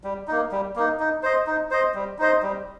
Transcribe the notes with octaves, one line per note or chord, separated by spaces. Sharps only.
G3
A#3 D#4
G3
A#3 D#4
D#4
C5 D#5
D#4
C5 D#5
G3
D#4 C5 D#5
G3